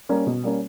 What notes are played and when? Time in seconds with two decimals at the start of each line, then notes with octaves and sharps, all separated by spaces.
0.09 G3 A#3 C#4
0.27 B2
0.44 G3 A#3 C#4